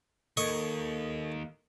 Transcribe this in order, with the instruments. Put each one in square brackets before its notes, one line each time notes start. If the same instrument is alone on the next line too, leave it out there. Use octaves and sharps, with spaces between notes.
[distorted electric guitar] D#2 [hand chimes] A4 A#4 [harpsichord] D#5 C#6